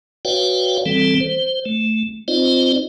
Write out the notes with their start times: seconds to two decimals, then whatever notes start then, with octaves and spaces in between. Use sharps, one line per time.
0.25 F#4 B4 C#5 D5 F5 G5
0.86 E3 G3 C4 A4
1.20 C5
1.65 A3
2.28 C4 D#4 F4 C5 D5 D#5